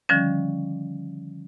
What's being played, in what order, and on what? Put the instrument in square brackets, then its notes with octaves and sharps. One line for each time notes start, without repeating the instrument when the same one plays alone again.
[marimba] D3 D#3 F3 G3 C#4